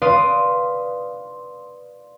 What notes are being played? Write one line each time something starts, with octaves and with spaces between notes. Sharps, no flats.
B4 D5 F5 C6 D#6